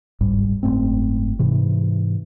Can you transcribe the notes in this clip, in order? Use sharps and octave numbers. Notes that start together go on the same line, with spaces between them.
G1 C2 G#2 G3
F#1 G#2 A3 C4
G#2 C3 E3